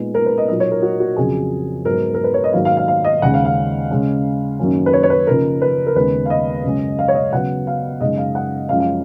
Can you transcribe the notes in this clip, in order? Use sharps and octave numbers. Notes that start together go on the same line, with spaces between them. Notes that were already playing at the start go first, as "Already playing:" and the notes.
Already playing: A#2 G#3 B3 D#4
A#4
B4
D#5
A#2 F#3 A#3 D#4 D#5
C#5
A#4
F#4
F#4
F2 C#3 F#3 G#4
G#2 F#3 B3 A#4
A#4
B4
C#5
D#5
G#2 D#3 F#3 A#3 F5
F5
F5
F5
D#5
D#2 C#3 G#3 F#5
F5
F5
C#3 G#3 C#4
F#2 D#3 F#3 A#3 C#4
B4
C#5
C#5
B4
C#3 F3 A#3 D#4 A#4
B4
A#4
D#2 C#3 G#3 B3 B4
F5
D#5
F#2 C#3 G#3 C#4
F5
C#5
D#5
C#3 F#3 B3 F#5
F5
F#2 C#3 G#3 D#4 D#5
F5
F#5
F#2 F3 G#3 C#4 F5
F5